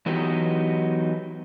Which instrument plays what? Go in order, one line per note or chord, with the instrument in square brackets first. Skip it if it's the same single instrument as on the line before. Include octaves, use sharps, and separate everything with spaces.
[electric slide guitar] E3 F#3 B3 D#4 G4